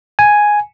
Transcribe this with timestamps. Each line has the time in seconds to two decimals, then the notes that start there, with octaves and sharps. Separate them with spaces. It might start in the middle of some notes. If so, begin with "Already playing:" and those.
0.19 G#5